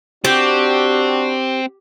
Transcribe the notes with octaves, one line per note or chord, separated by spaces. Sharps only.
C4 D4 F#4 G4